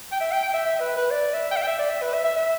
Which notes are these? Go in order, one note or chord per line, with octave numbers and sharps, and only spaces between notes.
G5
E5
G5
G5
E5
E5
B4
B4
D5
E5
G5
E5
G5
E5
D5
E5
B4
E5
E5
E5